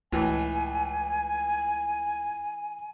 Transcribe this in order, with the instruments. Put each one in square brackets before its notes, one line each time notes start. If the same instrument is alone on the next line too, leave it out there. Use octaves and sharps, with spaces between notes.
[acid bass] C#2 [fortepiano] A2 E3 [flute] G#5